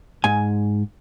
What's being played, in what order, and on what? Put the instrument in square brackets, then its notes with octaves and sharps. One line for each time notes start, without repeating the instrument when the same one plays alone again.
[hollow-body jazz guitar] G#2 G#5